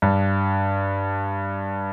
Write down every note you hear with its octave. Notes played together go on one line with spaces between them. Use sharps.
G2